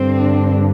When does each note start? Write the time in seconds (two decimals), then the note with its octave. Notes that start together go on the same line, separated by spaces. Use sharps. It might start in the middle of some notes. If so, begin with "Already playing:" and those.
Already playing: G2 D3 C4
0.16 D4